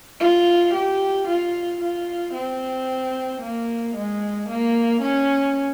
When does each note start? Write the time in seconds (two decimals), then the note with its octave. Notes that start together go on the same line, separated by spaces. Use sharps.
0.20 F4
0.74 G4
1.28 F4
1.81 F4
2.34 C4
3.42 A#3
3.96 G#3
4.49 A#3
5.02 C#4